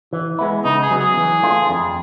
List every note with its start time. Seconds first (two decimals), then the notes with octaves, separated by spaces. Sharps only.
0.13 E3
0.39 G#3 B3 E4
0.65 C#3 D#4
0.82 G#4
0.91 F#3 B3
1.00 G#4
1.17 E3
1.43 A3 D4 F4
1.69 F2